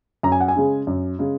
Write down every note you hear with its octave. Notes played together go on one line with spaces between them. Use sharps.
F#2 A#5
G#5
F#5
G#5
C#3 G#3
F#2
C#3 G#3